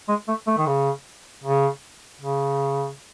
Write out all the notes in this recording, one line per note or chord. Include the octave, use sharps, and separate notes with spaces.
G#3
A3
A3
D#3
C#3
C#3
C#3